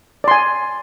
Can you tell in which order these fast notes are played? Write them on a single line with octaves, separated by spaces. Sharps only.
D5 C6 G#5